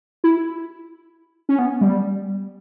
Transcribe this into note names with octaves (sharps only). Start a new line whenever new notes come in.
E4
C#4
B3
G3